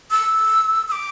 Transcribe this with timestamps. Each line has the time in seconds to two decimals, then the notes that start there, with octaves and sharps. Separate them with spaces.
0.11 E6
0.88 E6
0.92 D6